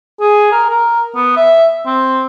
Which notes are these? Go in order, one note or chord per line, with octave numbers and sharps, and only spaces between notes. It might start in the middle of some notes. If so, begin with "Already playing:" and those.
G#4
A#4
A#4
B3
E5
C4